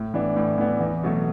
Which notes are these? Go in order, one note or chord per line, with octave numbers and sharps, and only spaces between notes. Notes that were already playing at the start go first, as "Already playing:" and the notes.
Already playing: A2
E3 B3 D4
A2
E3 B3 D4
E2
B2 F#3 A3